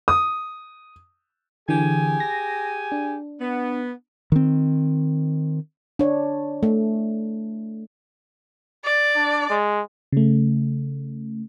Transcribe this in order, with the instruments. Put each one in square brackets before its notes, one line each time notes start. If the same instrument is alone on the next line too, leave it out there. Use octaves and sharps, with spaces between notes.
[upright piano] D#6
[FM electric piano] D3 E3 [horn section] G4 G#4 G#5
[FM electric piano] A#6
D4
[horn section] B3
[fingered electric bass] D#3 C4
[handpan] D4 C#5
A3
[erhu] D5
[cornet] D4
G#3
[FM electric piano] C#3 A3